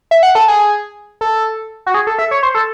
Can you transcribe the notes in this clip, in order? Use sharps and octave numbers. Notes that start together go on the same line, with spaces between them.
E5
F#5
A4
G#4
A4
F#4
G#4
A4
E5
C#5
C5
A4